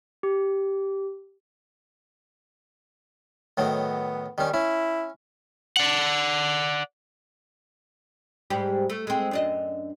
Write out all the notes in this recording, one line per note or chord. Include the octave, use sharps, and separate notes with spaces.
G4
A2 D#3 F#3 B3
D#3 G3 C#4
C#4 E4
D5 F#5
G#2 G3 G4
A3
G#3 C4
F#2 D4 D#5